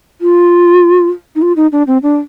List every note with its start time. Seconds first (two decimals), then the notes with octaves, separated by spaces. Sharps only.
0.21 F4
1.35 D#4
1.42 F4
1.56 D#4
1.72 D4
1.87 C4
2.03 D4